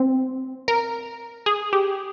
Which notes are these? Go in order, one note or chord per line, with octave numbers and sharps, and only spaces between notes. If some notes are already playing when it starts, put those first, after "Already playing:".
Already playing: C4
A#4
G#4
G4